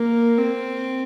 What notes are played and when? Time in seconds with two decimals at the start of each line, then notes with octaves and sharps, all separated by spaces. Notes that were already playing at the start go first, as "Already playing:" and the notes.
Already playing: A#3
0.37 C4